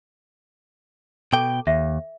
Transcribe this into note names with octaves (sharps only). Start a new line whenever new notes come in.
B2 A4 G5 A5 D6
D#2 E5